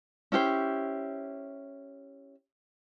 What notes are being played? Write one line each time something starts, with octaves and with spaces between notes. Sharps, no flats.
C#4 E4 G4 C5